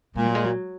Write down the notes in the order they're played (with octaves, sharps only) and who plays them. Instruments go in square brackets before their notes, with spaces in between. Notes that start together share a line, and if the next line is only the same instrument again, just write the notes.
[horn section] A#2 [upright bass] G#3
[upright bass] F#3
G#3
F#3